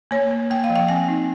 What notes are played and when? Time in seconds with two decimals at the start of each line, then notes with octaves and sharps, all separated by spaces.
0.11 A#3 C#5
0.31 A#3
0.50 A#3 G5
0.64 F5
0.70 F3
0.76 G5
0.88 C4 G#5
1.08 D#4